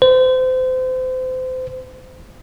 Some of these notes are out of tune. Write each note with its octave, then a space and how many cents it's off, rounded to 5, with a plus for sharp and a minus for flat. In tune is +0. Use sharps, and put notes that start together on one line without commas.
C5 -30